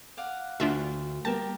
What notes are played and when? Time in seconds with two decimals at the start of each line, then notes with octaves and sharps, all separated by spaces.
0.17 D5 F5 F#5
0.60 D2 D4 F4 F#4 E5
1.25 G3 A#3 B3 G4 A#4 G5 A5